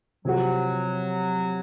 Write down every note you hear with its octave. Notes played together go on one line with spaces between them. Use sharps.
C3 F3 F#3 C4 F#4